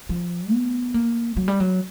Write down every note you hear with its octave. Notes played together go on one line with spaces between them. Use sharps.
F3
B3
A#3
F#3
G3
F#3